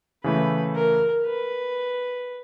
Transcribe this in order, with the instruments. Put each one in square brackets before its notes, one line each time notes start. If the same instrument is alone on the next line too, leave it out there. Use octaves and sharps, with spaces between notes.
[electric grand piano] C#3 E3 A3 [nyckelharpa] B4
[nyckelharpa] A#4
B4